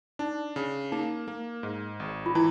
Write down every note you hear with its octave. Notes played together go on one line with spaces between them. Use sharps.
D4 D#4
C#3
A#3 D#4
A#3
G#2
G#1
F4
E3 E4